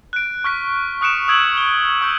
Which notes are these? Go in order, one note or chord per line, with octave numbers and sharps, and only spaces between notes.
F#6 D7
C#6 F6 F#6 B6 D7
C#6 D#6 F#6 C#7 D7 E7
D#6 E6 G#6 D7 F#7
E7 G7
C#6 E6 G6